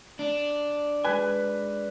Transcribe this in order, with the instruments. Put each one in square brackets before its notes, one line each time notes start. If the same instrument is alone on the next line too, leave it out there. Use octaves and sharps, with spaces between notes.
[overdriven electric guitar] D4
[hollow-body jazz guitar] G#3 G#5 [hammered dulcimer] B4